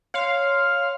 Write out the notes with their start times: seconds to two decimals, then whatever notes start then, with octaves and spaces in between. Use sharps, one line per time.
0.14 C#5 F5 C6